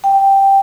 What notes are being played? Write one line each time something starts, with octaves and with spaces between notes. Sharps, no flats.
G5